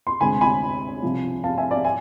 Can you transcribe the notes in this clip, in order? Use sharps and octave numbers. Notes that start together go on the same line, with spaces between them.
C6
D2 C3 G#3 G#5 B5
G#5 B5
C2 C3 F3
F5 A5
E5 G#5
D5 F5
E5 G#5